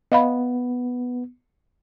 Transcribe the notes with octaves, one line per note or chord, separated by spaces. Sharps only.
B3 D#5 F5 B5